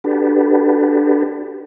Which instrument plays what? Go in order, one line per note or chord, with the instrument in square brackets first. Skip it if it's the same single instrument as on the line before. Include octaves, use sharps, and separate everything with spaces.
[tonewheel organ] D4 F#4 G4 A4 B4